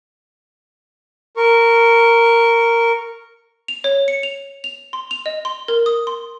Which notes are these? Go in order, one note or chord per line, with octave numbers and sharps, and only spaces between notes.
A#4 C#6
F7
C#5
C#7
F7
F7
C6
F7
D#5
C6
A#4
D#6
C6